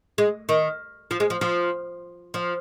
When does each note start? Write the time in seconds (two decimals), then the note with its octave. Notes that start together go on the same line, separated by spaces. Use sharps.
0.18 G#3
0.49 D#3
1.11 F3
1.20 G#3
1.30 F3
1.41 F3
2.34 F3